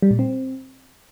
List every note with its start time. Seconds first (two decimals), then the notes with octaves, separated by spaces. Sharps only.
0.02 G3
0.11 A#2
0.19 C4